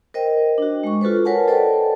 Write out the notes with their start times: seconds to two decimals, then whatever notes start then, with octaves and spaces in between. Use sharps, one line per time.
0.14 A#4 C5 D#5 G5
0.58 D4 F#4
0.83 G#3 C#6
1.01 F4 F#4 A4 B4 C5
1.25 A#4 B4 C#5 F#5 G#5 A5
1.48 A4 C5 D5 D#5 G5 A5